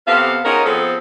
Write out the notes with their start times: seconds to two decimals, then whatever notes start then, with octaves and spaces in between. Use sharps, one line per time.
0.07 C3 B3 C4 A4 F5
0.45 C#4 D#4 F4 F#4 G#4 A#4
0.66 F3 B3 C4 G#4 A4